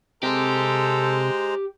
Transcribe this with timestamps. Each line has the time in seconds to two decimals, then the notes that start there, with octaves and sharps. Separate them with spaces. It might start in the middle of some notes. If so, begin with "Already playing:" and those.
0.23 C3 G#3 G4 A4 C5 A#5